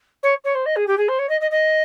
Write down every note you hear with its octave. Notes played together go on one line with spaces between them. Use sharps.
C#5
C#5
C5
D#5
G#4
G4
G#4
C5
C#5
D#5
D#5
D#5